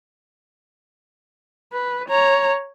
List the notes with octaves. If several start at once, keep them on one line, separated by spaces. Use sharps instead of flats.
B4
C#5 A#5